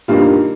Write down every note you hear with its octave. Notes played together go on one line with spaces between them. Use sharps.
G2 D#3 G3 A#3 F4